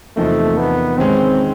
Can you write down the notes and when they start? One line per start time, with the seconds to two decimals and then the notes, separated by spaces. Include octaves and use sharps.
0.16 E2 C3 F3 A3 A#3 D#4
0.58 B3
0.98 D#3 G#3 C4 C#4